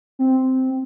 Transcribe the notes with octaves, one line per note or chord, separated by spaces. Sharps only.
C4